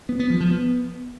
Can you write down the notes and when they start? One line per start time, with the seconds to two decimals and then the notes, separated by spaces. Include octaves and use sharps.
0.09 B3
0.19 B3
0.30 F3
0.40 F3
0.51 B3